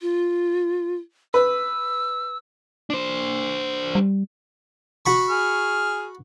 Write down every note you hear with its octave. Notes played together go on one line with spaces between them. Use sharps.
F4
B4 E6
D4 C5
G3
F#4 B5 C#6
G#4 F6